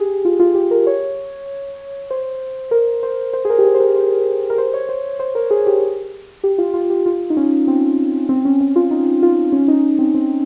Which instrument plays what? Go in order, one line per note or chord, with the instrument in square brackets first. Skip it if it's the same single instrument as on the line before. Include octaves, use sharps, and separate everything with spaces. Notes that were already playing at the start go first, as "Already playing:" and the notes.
Already playing: [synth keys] G4 G#4
F4
F4
G4
A#4
C#5
C5
A#4
C5
C5
G#4
A#4
G4
G#4
C5
A#4
C5
A#4
C5
C#5
C5
C5
A#4
G#4
G4
G4
F4
F4
G4
F4
D#4
C#4
C4
C4
C#4
C#4
F4
D#4
F4
C#4
D#4
C4
C4